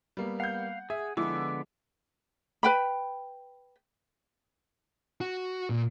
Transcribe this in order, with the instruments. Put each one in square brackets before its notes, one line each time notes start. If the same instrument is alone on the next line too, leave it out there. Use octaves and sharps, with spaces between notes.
[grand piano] G3 A#3 B3
[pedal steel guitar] F5 [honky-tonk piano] F#5 G6
[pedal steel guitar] G#4 [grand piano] E5
[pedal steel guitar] D3 B3 D6 [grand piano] F3 G#3 [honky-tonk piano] E4
[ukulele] B4 G5 B5
[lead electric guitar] F#4
A#2